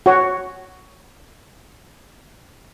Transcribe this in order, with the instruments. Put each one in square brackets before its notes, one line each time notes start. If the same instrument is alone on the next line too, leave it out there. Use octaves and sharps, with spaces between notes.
[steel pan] F#4 C#5